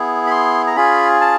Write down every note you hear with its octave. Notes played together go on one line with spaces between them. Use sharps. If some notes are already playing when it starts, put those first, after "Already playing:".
Already playing: B3 E4 G#4
B5
C6
A#5
C#4 F4 G#4 B5
A5